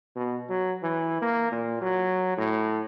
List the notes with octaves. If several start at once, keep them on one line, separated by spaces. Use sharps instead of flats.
B2
F#3
E3
A#3
A#2
F#3
A2